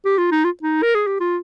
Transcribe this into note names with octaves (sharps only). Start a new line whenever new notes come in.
G4
F4
D#4
F4
D#4
A#4
G#4
G4
F4